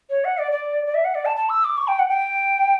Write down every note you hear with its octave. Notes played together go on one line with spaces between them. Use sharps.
C#5
F#5
D5
D5
D5
E5
F#5
D5
A5
A5
E6
D6
C#6
G5
F#5
G5